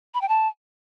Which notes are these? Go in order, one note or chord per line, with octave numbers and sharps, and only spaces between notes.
B5
G5
A5